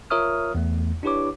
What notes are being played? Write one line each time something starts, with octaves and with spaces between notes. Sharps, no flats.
F4 A#4 C#5 E5 D#6 F6
E2 A3
D4 E4 G4 B4 C#5 D6